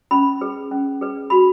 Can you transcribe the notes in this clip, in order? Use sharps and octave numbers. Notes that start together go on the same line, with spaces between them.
C#4 B5
G#4 B4
C#4
G#4 B4
F#4 B5